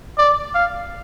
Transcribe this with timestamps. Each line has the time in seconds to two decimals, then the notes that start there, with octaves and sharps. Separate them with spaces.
0.18 D5
0.55 F5